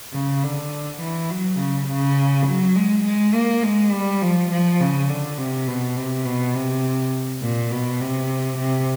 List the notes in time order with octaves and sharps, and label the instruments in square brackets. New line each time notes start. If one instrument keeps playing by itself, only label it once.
[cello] C#3
D3
E3
F#3
C#3
C#3
F#3
G#3
G#3
A#3
G#3
G3
F3
F3
C#3
D3
C3
B2
C3
B2
C3
A#2
B2
C3
C3